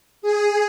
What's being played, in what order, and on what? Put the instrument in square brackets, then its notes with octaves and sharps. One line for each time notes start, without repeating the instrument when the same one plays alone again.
[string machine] G#4